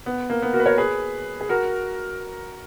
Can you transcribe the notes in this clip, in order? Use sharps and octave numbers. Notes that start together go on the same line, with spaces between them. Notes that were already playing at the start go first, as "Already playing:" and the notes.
B3
A#3
B3
F#4 A#4
B4
A#4 C#5
G#4 B4
G#4
F#4 A#4